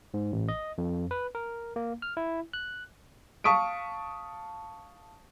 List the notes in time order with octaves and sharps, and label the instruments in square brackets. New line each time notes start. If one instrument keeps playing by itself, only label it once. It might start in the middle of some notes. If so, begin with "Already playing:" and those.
[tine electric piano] G#2
A1
D#5
F2
B4
A#4
A#3
F6
E4
F#6
[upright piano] F5 A5 C#6 D#6 B6 D7